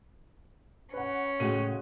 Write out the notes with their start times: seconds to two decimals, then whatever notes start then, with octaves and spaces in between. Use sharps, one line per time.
0.94 C#4 B4 F#5
1.40 A2 C#3 G#3 F#4 D#7